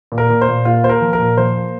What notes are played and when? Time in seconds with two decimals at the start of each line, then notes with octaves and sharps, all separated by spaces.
0.12 A#2
0.18 A#4
0.30 A#2
0.41 C5
0.48 A#2
0.65 A#3 F4
0.84 A#3 C5
0.89 A#4
1.01 F3
1.13 A#4
1.19 A#2
1.37 F3 C5
1.55 A#3